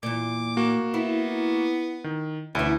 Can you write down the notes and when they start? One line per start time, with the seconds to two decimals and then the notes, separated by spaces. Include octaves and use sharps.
0.03 E2 A#2 D6
0.57 A#3 F#4
0.94 B3 E4
2.04 D#3
2.55 D2 E3 C#4 E4